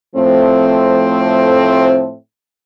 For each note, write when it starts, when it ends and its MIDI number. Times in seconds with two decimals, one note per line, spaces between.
0.16 2.15 45
0.16 2.15 53
0.16 2.15 57
0.16 2.15 60